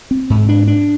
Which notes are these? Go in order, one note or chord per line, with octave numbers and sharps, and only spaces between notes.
C4
G#2
D4
D4